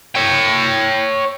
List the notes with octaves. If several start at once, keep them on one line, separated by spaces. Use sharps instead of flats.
C#5 G5